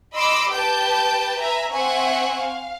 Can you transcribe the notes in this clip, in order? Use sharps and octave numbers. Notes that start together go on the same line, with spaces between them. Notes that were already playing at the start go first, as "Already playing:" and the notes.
D#5 B5 C6 D6 E6
G4 B4 G5 A5 G6
B4 E5 G#5 A#5
C4 C5 E5 F#5 G#5 C#6
F5